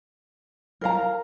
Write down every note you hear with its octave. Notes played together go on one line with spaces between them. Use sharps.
A#4 F5 A#5